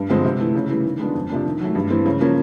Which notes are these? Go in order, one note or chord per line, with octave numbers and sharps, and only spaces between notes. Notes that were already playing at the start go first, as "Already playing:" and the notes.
Already playing: G2
D3 F3 G#3 C4
C3
E3 A3
C#3
E3 G3
D#3
G#3 B3 D4 F4
F2
C3 F3 A#3 D4
D#3
F#3 A3
G2
E3 G3 C4
C#3
F3 A#3 C#4